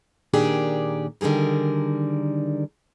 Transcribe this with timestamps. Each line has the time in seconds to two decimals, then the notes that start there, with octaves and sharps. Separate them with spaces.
0.33 A#2 D#3 D4 G4 G#4 D5
1.21 D3 D#3 G3 G#4 A#4